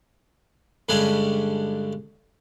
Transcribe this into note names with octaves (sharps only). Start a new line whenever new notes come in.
G2 D3 G#3 C#4 G#5 B5